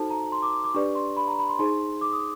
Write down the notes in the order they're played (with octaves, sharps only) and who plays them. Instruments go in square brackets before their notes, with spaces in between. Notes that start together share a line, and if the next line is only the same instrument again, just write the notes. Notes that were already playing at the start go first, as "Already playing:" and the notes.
Already playing: [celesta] D#4 F#4 A4 C5 A5
A#5
C6
D6
D6
D6
D4 G4 B4 D5 C#6
C6
B5
A#5
B5
C6
D#4 G#4 C5 C6
D6
D#6